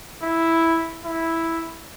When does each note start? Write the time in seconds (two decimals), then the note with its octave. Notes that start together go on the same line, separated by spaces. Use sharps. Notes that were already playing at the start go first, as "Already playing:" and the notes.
0.23 E4
1.04 E4